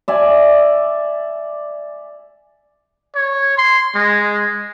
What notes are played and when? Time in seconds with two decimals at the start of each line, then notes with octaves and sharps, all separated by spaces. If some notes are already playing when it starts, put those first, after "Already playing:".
0.08 D5 E5 G#5
3.15 C#5
3.58 C6
3.95 G#3